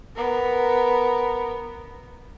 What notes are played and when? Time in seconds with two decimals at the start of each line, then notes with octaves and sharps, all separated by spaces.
0.15 B3 A#4